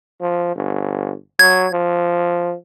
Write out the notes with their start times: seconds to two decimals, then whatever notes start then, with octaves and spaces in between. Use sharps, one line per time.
0.21 F3
0.56 G1
1.39 F#3 G#6
1.73 F3